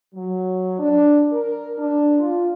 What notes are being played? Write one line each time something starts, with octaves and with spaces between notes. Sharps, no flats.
F#3
D4
A#4
D4
F4